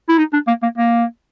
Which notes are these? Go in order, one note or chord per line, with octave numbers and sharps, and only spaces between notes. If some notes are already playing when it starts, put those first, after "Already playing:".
E4
D#4
D4
A#3
A#3
A#3